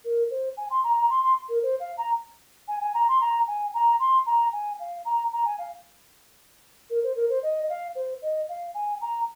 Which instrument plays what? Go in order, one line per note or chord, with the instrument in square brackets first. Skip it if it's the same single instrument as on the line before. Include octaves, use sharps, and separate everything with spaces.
[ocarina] A#4
C5
G#5
C6
A#5
A#5
C6
C6
A#4
C5
F5
A#5
G#5
G#5
A#5
C6
A#5
G#5
A#5
C6
A#5
G#5
F5
A#5
A#5
G#5
F5
A#4
C5
A#4
C5
D#5
D#5
F5
C5
D#5
F5
G#5
A#5